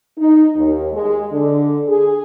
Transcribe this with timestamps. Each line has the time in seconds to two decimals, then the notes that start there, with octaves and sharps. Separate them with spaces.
0.18 D#4
0.56 D#2
0.93 G#3
1.32 D3
1.89 G#4